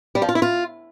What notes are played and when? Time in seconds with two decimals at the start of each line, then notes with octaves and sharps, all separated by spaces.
0.15 G3
0.22 F3
0.29 F4
0.35 E4
0.42 F4